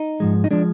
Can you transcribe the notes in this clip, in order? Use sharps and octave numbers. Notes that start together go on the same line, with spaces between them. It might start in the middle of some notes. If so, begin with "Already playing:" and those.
Already playing: D#4
G#2 F3 G#3
D#4
F3 G#3 D4